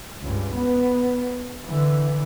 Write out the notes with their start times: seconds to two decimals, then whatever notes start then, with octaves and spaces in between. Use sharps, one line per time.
0.21 C#2 G2
0.55 B3
1.66 D3 E3